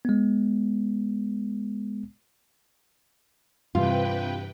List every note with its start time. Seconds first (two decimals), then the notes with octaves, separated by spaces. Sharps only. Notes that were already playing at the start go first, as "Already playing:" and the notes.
0.05 G#3 B3
3.75 G2 C3 E3 F4 B4 G5